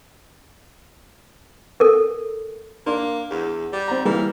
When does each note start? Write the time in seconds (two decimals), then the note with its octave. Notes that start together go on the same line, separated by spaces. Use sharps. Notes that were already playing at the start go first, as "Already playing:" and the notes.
1.80 A4 A#4
2.86 A#3 D4 C6
3.31 E2
3.73 G3
3.88 C4 A#5
4.05 E3 G3 A#3